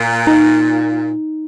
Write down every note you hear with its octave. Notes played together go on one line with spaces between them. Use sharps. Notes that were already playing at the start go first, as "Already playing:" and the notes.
Already playing: A#2
D#4